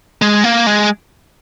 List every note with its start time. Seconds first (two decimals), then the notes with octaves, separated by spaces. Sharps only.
0.22 G#3
0.44 A#3
0.67 G#3